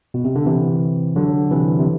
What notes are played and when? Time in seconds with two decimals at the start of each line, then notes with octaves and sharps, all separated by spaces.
0.14 B2
0.24 C3
0.35 D3
0.46 C3 E3
1.16 D3 F#3
1.50 C3 E3
1.79 C3